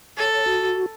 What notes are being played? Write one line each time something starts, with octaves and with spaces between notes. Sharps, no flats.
A4 C#5
F#4